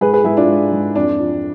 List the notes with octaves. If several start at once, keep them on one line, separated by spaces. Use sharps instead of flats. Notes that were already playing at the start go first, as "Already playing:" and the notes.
G#2 G#4 B4
G#4 B4
G#2 E4 G#4
D4 F4
G#3
G#2
F2 D4
F3